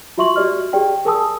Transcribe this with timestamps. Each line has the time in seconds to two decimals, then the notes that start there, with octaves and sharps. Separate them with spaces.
0.17 F4 F#4 E5 C6 C#6 F#7
0.36 F#4 G4 D5 D#5 F6
0.73 G4 G#4 D5 G5
1.05 G#4 A#4 G#5 A5 D#6 E6